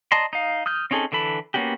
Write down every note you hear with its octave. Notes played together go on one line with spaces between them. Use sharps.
D5 D#5 A5 A#5 C6
D#4 F5
D#6 F6 G6
C4 C#4 D#4 G#4 A4
D3 E3 A4 B5
A#3 B3 C#4 F#4 G4